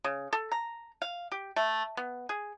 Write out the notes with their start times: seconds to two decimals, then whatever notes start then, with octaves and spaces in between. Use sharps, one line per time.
0.04 C#3
0.33 A4
0.52 A#5
1.02 F5
1.32 G4
1.56 A3
1.97 B3
2.29 G#4